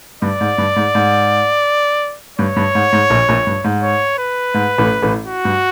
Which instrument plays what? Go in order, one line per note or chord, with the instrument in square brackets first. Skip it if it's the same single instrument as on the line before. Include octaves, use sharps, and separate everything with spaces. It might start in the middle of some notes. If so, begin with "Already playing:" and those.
[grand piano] G2 [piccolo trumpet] D5
[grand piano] G#2
G2
G#2
G#2
[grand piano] G2 [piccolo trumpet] C#5
[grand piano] G2
G#2
G#2
A#1 A#2
A#1 A#2
G2
G#2
[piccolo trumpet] C#5
B4
[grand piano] G#2
A1 A2
A1 A2
[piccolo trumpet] F#4
[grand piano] G2